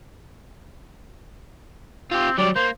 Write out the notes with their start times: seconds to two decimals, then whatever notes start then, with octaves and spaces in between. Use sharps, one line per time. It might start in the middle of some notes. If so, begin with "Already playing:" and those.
2.11 C4 F4 G4
2.38 F#3 G3 D5
2.56 A#3 C5